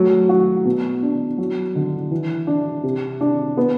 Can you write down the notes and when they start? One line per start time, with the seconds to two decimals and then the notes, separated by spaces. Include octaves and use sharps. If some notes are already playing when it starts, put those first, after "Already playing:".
Already playing: F#3 A3
0.29 F#4
0.65 B2
1.02 D4
1.38 F#3
1.75 D3
2.11 E3
2.47 D4
2.83 C3
3.21 D4
3.57 B3